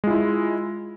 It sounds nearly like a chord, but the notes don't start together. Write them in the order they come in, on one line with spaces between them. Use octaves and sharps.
G#3 F4 E4